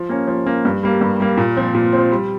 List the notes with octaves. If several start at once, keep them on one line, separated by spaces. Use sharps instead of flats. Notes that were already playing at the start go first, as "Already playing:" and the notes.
Already playing: F3
A#3 C#4
F3
A#3 C#4
G2
G3 A#3
G2
G3 A#3
A#2
F3 C4
A#2
C4
F3
G3